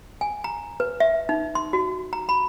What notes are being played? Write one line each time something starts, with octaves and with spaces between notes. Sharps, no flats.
G#5
A#5
B4
E5
D#4
C6
F#4
A#5
B5